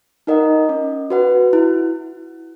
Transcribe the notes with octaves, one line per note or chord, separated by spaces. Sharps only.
D#4 A#4 D#5 F#5
C#4
F#4 B4 F#5
E4